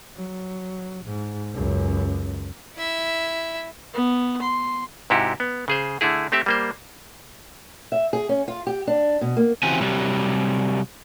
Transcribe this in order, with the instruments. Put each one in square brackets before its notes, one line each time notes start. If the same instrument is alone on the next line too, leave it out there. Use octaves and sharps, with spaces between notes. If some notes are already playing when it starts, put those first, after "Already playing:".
[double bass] F#3
G#2
C#2 F#2
[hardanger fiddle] E4 E5
[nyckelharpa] B3
C6
[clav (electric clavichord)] G#2 C3 E4 F#4 G4
B3
C#3 G#4 C5
D3 A3 E4 G#4
A3 C4 G4 E5
G3 A#3 C5
[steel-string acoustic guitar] E5
G#4
C#4
F4
G4
D4
B2
A#3
[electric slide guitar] C#3 E3 C4 F#4 G4 G#5
C3 F#3 G3